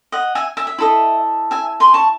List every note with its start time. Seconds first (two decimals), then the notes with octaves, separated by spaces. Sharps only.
0.12 D#5 F#5
0.35 E5 G#5
0.57 E5 G#5
0.67 E5
0.78 E4 A4 D#5
1.51 E5 G#5
1.80 G#5 C6
1.94 A5 C#6